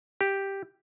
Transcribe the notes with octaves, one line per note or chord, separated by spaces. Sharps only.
G4